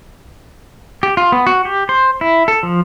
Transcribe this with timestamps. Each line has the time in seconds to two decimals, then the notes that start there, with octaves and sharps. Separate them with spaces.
1.03 G4
1.17 F4
1.32 B3
1.47 F#4
1.65 G4
1.89 C5
2.21 E4
2.48 A4
2.63 F3